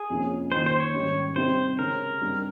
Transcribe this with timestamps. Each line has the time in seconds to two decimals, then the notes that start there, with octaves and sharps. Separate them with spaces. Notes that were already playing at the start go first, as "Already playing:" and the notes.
Already playing: G#4
0.10 F2 C3 F3 A#3 C#4
0.52 D#3 A#3 D#4 C5
0.66 C5
0.80 C#5
0.94 G#2 D#3 G3 C#4
1.36 C3 G3 C4 D#4 C5
1.79 C#3 G#3 C#4 A#4
2.21 G2 G3 C4 D#4